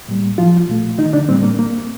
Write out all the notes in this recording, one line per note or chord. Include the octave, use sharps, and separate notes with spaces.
A2 G3 A#3
F3 F4
A#2 A3
D#3 D#4
D3 D4
A2 G3 A#3 C4
A#3
A#3